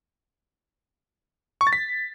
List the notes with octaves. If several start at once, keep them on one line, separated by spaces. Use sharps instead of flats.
C#6
A6
B6